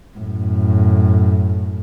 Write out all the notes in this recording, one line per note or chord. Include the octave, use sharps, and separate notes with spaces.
F#2 A2